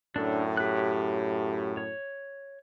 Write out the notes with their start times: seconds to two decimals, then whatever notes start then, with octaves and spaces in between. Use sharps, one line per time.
0.16 F#2 A2 D4 A4
0.57 G4 F#6
1.77 C#5